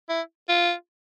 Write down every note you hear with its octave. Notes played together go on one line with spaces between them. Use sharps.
E4
F4